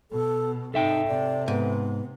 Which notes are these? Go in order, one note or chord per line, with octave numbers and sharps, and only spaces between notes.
B2 A4
G#2 C3 D#4 A4 E5 G5
C3 D5
G#2 B3